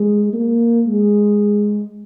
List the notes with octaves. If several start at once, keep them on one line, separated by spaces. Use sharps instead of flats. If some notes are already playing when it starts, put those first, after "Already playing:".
Already playing: G#3
A#3
G#3